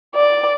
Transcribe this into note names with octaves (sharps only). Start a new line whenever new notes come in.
D5